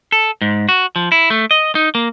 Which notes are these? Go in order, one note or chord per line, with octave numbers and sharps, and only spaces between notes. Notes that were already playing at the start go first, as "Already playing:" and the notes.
A4
G#2
F#4
F3
E4
A3
D#5
D#4
A#3